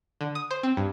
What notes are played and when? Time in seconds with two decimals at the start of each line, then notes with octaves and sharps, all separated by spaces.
0.21 D3
0.35 D#6
0.51 C5
0.63 C4
0.77 G2